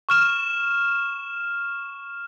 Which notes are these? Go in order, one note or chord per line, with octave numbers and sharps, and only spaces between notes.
C#6 F6 E7